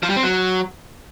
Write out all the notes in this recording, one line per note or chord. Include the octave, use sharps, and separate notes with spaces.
F3
G3
C4
F#3